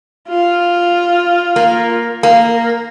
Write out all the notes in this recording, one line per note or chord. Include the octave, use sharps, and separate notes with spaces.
F4
A#3
A#3